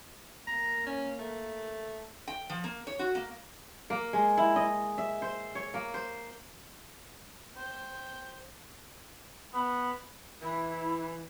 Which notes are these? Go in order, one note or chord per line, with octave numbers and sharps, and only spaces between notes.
A#3 A#5
C#4
A3
G5
F3
A#3
C#5
F#4
A#3
A#3
G#3
E4
D#5
E5
C5
C#5
A#3
C5
C5 G5
B3
E3 E4